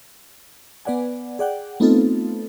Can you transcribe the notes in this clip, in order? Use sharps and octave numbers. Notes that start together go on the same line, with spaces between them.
B3 B4 D5 F#5 G#5
G#4 D5 F#5 G5
A3 B3 C4 D#4 F4 A4